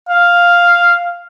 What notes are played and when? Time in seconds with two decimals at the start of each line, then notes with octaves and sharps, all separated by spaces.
0.09 F5